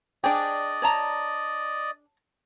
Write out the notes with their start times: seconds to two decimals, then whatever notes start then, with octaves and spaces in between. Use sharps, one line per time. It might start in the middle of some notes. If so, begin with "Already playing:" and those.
0.24 D4 G#4 D5 D#5 G5
0.82 C#5 A5 A#5